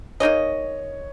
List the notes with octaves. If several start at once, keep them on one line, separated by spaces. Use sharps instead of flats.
A#3 D#4 G#4 C#5 D#5